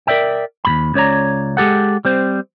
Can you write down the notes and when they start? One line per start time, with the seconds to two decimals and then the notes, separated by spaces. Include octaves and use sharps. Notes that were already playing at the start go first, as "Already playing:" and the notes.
0.07 A#4 D5 E5 G5
0.65 D#2 G#2 B5
0.94 C#2 C#3 C#5 D5 A#5
1.57 G#3 G4 A4 F#5
2.05 G3 C4 C5